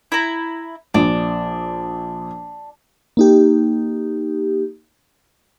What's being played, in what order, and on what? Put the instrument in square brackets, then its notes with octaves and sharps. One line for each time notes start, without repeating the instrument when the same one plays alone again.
[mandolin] E4 A#5
[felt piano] A#1 [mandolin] D4
[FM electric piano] A#3 D#4 G4